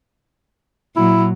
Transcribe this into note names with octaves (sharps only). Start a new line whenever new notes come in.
A#2 F#3 E4